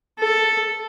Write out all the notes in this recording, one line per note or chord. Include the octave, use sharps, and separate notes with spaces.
A4